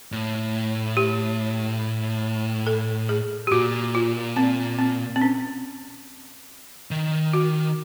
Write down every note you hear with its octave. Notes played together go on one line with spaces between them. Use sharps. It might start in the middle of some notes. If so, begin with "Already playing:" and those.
A2
G4
A4
G#4
G4
A#2 F#4
F4
C4
C4
C4
C#4
D#3
F#4